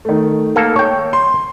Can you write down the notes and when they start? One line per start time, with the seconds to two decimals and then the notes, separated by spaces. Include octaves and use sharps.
0.05 D#3 A3
0.56 A#3 A4
0.76 C#5 G5
1.13 C6